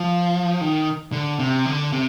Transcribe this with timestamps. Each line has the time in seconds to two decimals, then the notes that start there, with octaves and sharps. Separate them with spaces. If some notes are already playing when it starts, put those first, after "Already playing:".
Already playing: F3
0.61 D#3
1.12 D3
1.39 C3
1.66 D3
1.92 C3